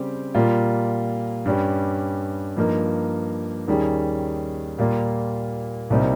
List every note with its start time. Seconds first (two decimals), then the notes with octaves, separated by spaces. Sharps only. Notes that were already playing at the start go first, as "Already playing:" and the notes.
Already playing: C#3 G3 C4 G4
0.35 A#2 G3 A#3 F4 A#4
1.46 G2 G3 C#4 G4
2.56 G2 F3 A#3 D#4 A#4
3.68 D#2 D#3 G3 C#4 G#4
4.78 A#2 G3 A#3 F4
5.90 C2 A#2 G3 C4 D#4